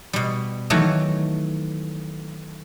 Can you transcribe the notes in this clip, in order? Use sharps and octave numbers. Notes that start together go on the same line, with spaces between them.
B2 G3
D#3 E3 F#3 A3